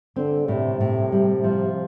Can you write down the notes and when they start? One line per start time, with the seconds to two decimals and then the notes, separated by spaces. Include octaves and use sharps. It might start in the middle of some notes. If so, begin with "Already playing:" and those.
0.16 D3 C4
0.48 A2 C3
0.81 A2
1.12 G3
1.44 F3